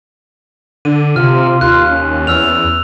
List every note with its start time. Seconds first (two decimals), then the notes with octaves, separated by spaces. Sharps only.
0.85 D3 D#7
1.16 C3 F4 F6
1.61 D#2 F4 F#6
1.91 C#4
2.27 E2 E6 F6 F7